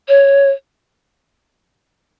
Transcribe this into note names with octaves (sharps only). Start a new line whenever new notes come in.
C#5